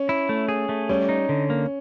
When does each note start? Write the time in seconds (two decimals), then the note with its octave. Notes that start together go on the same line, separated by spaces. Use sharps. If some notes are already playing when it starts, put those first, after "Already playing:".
Already playing: C#4
0.09 E4
0.29 A3
0.48 G#4
0.69 A3
0.89 G3 C#4
1.09 D#4
1.29 D3
1.50 A#3